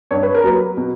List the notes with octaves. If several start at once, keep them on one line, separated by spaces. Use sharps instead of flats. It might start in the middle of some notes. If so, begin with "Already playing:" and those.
G2 C#5
B4
A#4
F#3 A#3 B4
B2